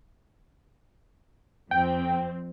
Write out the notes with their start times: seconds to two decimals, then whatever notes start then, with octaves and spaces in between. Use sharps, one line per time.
1.71 F2 C4 G5